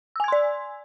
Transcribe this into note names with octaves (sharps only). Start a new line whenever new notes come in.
D5 G#5 C6 E6 G#6